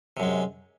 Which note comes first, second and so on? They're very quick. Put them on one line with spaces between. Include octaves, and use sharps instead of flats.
C3 F#2 G#3